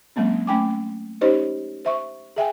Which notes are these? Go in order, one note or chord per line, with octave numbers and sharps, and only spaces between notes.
F#3 G#3 A#3 C4 C#4
A3 C#4 G5 G#5 D6
C#4 D#4 G4 C5 C#5 D#5
C5 E5 C#6
G#4 E5 G5 G#5